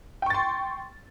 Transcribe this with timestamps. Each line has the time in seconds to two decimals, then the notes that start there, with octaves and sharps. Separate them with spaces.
0.22 G5
0.26 C#6
0.30 A6
0.34 C6